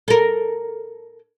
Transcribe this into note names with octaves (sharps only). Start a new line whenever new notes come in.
A4 A#4